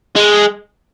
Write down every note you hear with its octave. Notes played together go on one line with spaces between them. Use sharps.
G#3